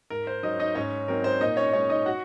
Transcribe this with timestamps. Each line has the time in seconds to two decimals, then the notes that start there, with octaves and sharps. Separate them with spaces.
0.10 G#2 A#4
0.27 C5
0.43 F#3 C#4 D#4 D#5
0.59 D#4 D#5
0.75 G#2 C#4 C#5
1.08 F#3 C4 D#4 A#4
1.24 C5
1.41 A#2 D#4 D#5
1.57 C#4 C#5
1.73 G#3 C#4 D#4 C#5
1.89 D#4 D#5
2.06 F#4 F#5